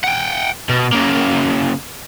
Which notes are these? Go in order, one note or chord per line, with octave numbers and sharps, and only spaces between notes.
F#5 G5
B2
C#3 A#3